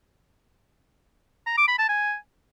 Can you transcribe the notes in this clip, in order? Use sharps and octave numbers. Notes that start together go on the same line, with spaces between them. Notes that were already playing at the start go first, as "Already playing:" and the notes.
A#5
D6
B5
A5
G#5